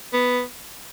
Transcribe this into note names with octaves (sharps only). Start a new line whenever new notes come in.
B3